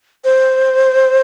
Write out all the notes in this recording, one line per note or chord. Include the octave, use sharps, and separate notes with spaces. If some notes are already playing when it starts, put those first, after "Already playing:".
C5